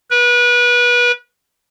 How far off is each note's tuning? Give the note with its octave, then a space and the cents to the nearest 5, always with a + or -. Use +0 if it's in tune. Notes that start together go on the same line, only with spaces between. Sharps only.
B4 -30